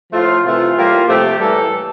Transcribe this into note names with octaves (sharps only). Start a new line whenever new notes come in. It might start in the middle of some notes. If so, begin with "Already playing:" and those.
A2 F3 A3 F4
C3 E3 A3 F4
A2 G3 A#3
C3 F3 A3 G4
A2 E3 G3 A#3 A4